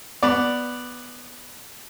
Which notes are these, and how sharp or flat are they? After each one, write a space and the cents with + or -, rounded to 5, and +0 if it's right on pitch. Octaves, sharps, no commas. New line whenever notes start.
B3 +0 D5 +0